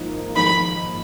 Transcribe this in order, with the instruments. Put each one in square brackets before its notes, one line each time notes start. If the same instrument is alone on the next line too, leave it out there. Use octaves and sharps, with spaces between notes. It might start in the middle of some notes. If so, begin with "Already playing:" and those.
Already playing: [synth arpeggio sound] G#1 G#2 F3 A#3 D#4
[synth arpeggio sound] G#1 G#2 F3 A#3 D#4 [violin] B5